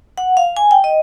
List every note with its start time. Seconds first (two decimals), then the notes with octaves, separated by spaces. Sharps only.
0.18 F#5
0.37 F5
0.57 G#5
0.71 G5
0.84 D#5